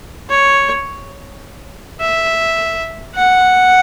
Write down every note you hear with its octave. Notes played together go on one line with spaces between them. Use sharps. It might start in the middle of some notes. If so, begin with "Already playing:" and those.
C#5
E5
F#5